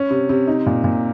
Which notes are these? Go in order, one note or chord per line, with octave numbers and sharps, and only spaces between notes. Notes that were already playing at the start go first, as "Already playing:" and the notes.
Already playing: C#4
C3
C3
D#4
A#2
A#2